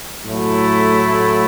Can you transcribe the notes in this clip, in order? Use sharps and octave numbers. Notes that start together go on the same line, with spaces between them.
A2 F#3 A3 E4